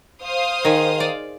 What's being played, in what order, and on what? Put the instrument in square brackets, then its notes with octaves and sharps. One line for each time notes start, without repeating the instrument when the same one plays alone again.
[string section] C5 F5 D#6
[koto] D#3 G#4
D5